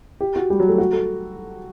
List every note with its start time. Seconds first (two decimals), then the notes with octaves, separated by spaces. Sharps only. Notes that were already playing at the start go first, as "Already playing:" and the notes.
0.21 G4
0.36 F#4
0.50 G3
0.60 F#3
0.69 A3
0.78 F#4
0.93 A4